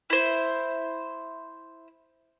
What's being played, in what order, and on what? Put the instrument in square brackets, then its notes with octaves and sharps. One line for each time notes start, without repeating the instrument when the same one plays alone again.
[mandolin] E4 C5